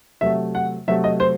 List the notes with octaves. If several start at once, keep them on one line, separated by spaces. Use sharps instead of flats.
C3 F#3 A3 E5
F#5
C3 F#3 A3 E5
D#5
C5